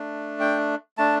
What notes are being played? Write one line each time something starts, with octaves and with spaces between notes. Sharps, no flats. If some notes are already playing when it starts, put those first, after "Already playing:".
Already playing: A3 D4
G5
A3 D4 A5